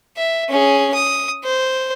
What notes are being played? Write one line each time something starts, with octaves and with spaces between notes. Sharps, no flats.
E5
C#4 G#4
D#6
C5